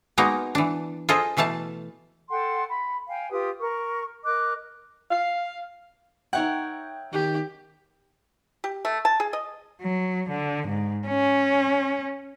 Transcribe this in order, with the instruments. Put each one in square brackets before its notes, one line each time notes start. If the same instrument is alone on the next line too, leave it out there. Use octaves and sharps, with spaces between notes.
[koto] G#3 A#3 B3 D#4 F#4 A#4
E3 D4
F4 G#4 A4 C5 D#5
B2 E3 A3 F5 A5
[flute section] A4 F#5 G5 C6
B5
F5 G5 G#5
F4 G4 B4 D#6
A#4 C#6
A#4 D#5 D6 F#6
[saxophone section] F5
[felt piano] D#4 E5 G5 [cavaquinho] A#4 C#5 F#5
[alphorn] D#3 [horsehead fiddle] G4
[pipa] G4
A3
A5
G#4
D#5
[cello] F#3
D3
G#2
C#4